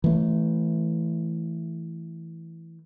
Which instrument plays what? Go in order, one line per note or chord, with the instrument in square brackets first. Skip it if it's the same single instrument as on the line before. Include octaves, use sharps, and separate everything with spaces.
[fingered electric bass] E3 A3